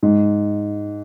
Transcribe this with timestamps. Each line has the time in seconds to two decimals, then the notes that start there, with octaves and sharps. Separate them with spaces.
0.03 G#2